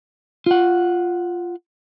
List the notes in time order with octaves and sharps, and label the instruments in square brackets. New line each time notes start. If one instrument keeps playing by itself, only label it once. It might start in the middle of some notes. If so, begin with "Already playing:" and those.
[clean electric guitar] F4 F#5